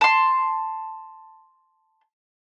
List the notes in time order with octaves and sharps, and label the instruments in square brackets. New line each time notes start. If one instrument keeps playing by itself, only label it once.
[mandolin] A5 C6